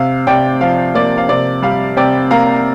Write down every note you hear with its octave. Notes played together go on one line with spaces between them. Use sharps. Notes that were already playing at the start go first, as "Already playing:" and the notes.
Already playing: C3 F5
C3 D5 G5
F3 F5
A#3 D5
F5
C3 D5
G3 F5
C3 D5 G5
A#3 F5 A#5